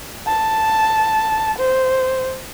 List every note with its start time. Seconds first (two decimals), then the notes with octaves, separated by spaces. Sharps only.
0.27 A5
1.58 C5